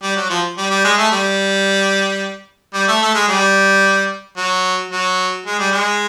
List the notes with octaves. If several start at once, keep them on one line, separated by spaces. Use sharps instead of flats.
G3
F#3
F3
G3
G3
G#3
A3
G3
G3
A3
A3
G#3
G3
F#3
F#3
G#3
G3
G#3